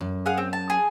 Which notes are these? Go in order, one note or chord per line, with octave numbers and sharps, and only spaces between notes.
F#2
G#4 F5 F#5
C4
A5
G#4